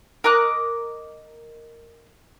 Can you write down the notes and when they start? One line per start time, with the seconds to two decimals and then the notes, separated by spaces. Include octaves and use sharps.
0.24 A#4 D#5 D6 F#6